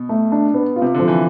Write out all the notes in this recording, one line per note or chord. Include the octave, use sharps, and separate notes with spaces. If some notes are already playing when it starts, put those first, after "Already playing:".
Already playing: B2
A3
D4
B3
F4
C3
D3 F3
E3